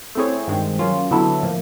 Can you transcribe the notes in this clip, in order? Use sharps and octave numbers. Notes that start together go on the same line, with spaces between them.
A3 C4 E4 G#4 C#5
G2 D#3 G#3 C4
F#3 A#3 C#4 F4
D3 F#3 B3 E4 A4
A2 F3 A#3